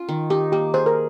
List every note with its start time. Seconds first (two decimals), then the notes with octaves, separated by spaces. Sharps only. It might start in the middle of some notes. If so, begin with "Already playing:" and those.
Already playing: C#4 F4
0.09 D#3
0.30 D#4 G4
0.52 A#3 G4
0.74 G#4 C5
0.86 A#4